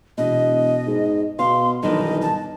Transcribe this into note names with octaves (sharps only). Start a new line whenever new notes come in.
E1 B2 D#5
G#2
B2 F5 C6
B1 G2 D#3 E3 D#5
A5